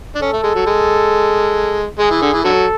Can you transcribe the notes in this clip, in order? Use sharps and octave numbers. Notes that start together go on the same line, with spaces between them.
D4
C#4 A4
A3
G#3
F#3
G#3
G#3 G#4
E3
D3
E3
D3 F#3 A4